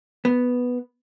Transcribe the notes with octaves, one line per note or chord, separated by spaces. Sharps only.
B3